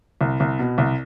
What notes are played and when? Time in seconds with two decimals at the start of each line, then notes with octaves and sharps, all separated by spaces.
0.21 C2
0.40 C2
0.59 B2
0.78 C2